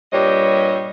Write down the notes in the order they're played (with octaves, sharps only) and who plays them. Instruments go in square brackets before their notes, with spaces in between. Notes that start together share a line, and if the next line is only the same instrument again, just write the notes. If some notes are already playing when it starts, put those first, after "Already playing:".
[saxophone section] G2 A#2 G3 G4 C#5 D#5